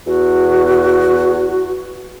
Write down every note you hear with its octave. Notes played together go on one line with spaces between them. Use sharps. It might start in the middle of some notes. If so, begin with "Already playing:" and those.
E2 F#4